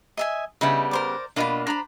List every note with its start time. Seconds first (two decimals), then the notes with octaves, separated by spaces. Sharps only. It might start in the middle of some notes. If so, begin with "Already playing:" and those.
0.17 D#5 E5 G#5
0.61 C#3 G3 B3 D#4 E5 B5
0.91 A#4 C5 D5
1.36 B2 A#3 D4 F4 D#5 B5
1.67 D4 C5 A#5 B5